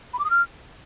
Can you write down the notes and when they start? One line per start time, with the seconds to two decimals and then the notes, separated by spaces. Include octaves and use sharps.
0.13 B5
0.19 D6
0.25 D#6
0.30 F6